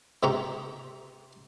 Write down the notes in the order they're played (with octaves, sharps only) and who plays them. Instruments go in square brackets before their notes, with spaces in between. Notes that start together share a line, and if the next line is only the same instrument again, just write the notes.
[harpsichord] G#2 C3 C4 G4 A#5 C#6